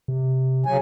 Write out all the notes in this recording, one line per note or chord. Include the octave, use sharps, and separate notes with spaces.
C3
C#3 F#3 G#5